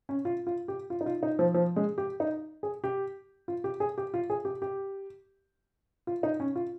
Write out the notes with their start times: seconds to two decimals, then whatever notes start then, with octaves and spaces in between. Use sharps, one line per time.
0.09 C#4
0.25 F4
0.47 F4
0.68 G4
0.90 F4
1.01 D#4
1.06 F4
1.23 D#4
1.39 F3
1.54 F3
1.76 G#3
1.98 G4
2.20 D#4
2.63 G#4
2.84 G4
3.48 F4
3.64 G4
3.80 G#4
3.98 G4
4.14 F4
4.30 G#4
4.45 G4
4.62 G4
6.07 F4
6.23 D#4
6.40 C#4
6.56 F4